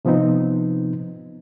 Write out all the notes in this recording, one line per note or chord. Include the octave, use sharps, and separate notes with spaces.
C3 F3 B3 C4 D#4